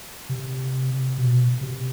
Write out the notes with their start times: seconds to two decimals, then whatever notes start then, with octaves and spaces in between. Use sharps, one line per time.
0.29 C3
1.18 B2
1.61 C3